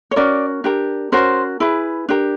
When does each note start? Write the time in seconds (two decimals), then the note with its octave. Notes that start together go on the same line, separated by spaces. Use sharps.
0.11 C#5
0.16 C#4 F#4 A#4 D5
0.64 D4 G4 A#4
1.12 C#4 F#4 A#4 C5
1.60 E4 G#4 B4
2.09 D4 G4 A#4